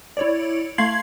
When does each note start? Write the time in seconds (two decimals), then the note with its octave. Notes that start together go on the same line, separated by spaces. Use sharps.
0.17 E4 C#5 D5
0.78 A3 F5 C6 G#6 C7 F#7